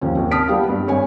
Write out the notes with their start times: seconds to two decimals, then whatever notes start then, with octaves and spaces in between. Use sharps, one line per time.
0.01 D#2 F3 C#4
0.16 G#1 D#2
0.31 A5 D#6 F6 B6 D7
0.48 G3 B3 F5
0.69 G2
0.87 G#1 C#5 G#5